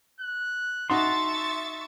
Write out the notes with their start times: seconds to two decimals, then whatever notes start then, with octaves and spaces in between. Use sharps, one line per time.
0.20 F#6
0.90 D#4 F#4 E5 A5 A#5 C6 C#6 A6